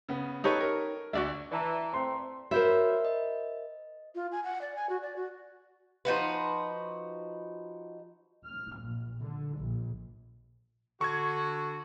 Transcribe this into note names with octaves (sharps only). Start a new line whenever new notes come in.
C#3 B3
D#4 G4 A4 B4 C#5 C#6
A#4
D2 F#4 D5 E5
E3 D5 A5 A#5
A3 C4 C6
F#4 A#4 C5 C#5 E5 B5
D#5
F4
G#5
F#5
D5
G#5
F#4
D5
F#4
F3 D#4 F#4 B4
F6
A#1
D3
A#1
D3 F#4 C#6 G#6